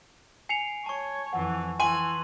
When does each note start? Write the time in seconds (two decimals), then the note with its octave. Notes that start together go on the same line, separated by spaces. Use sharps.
0.49 G#5 C7 C#7 F7
0.86 C#5 A5 C#6
1.33 F2 E3 F#5
1.80 E3 G#5 C6 D#7 F#7